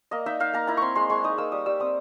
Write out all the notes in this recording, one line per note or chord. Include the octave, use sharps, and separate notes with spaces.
A#3 D#5
D#4 E5
D#4 F5
A#3 A#5
E4 A#5
C4 C6 C#6
G#3 C6
G#3 C#6
D#4 D#6
A#3 E6
G3 D#6
G3 E6
C4 D#6